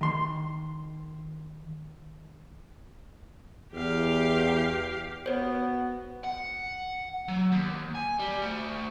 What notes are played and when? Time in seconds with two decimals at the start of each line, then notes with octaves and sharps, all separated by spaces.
0.01 D#3 C6
3.74 E2 G4 F5
5.26 B3 F#4 C5 C#5
6.24 F#5
7.28 F#3
7.52 D#2
7.95 G#5
8.19 G3
8.42 A3 F#4